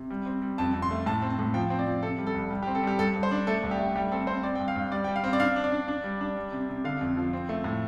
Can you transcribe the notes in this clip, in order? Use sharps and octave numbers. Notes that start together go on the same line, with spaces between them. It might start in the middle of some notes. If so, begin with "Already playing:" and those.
Already playing: C3
G3
C4
G3
F2 A5
F2
C6
A3
A2 A5
C4
A5
A2
F3 G5
C4
D5
F3
C3 A4
G3
A4
C2
G3
G4
C4
A4
G3 G4
G2 A4
G2
C5
D4
A3 A4
C2
G4
A3
G3 G4
C4 A4
C4 C5
C4 D5
G2 G5
F5
G2
G3 D5
G3 G5
F5
C4
D5
D4 F5
D4
D5
D4
D4
G3
D4
G3
C3
C3
D3 F5
F2
F3
C4
A3
A2